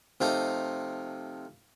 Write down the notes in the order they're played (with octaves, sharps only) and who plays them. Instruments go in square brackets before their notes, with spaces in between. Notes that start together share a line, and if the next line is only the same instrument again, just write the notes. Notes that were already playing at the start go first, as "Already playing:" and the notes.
[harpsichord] C3 F3 A3 D#4